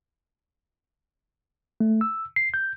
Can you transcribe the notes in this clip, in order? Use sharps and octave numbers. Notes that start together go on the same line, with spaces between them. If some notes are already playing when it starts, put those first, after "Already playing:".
A3
E6
C7
G6